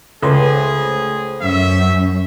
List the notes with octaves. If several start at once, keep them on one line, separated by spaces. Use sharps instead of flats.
C#2 A3 G#4 C5
F#2 E5